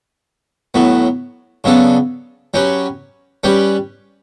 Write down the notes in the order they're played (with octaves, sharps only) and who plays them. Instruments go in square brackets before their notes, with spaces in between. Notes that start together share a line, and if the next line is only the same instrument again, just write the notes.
[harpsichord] A2 F#3 B3
C#3 F#3 B3 D4 A4
F#3 C#4 G4 B4
G3 C#4 G4 B4